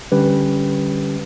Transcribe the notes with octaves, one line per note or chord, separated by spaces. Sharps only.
D3 G3 C#4 G4 B4